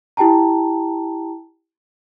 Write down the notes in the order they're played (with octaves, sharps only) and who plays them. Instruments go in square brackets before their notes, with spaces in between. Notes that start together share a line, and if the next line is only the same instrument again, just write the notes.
[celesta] E4 G4 G5 A5 A#5